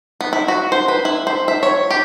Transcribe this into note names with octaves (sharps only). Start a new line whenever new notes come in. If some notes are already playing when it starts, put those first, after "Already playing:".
B3
E4
F#4
C5
B4
E4
C5
E5
C#5
G4